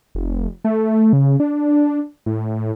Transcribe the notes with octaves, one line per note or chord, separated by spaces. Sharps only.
F1
A3
C#3
D4
A2